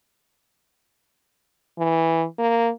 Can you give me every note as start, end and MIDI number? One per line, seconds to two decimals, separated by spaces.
1.78 2.25 52
2.38 2.70 58